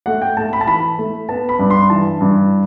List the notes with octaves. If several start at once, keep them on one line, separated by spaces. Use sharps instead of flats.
A3 F#5
G5
A3 A5
B5
A5
E3 B5
A3
B3 A5
B5
G2
C6
E3 A5
G2